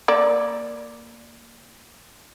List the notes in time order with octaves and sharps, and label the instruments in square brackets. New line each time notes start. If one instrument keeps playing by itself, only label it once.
[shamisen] A#3 D5